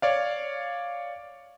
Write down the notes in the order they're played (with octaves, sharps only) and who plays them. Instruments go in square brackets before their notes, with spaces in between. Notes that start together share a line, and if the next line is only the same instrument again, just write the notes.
[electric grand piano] C#5 D5 F5